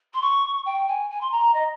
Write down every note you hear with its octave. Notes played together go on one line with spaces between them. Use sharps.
C6
C#6
G5
G#5
G#5
C6
A#5
D#5